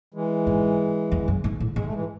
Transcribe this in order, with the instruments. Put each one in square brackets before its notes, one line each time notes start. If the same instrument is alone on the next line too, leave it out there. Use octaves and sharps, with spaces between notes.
[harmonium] E3 G#3
[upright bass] G#2
E2
F#2
G#2
A2
[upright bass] G#2 [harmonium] G#3
[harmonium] A3
E3 G#3